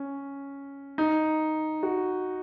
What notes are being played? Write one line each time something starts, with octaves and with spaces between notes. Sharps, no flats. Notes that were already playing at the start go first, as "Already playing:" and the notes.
Already playing: C#4
D#4
F#4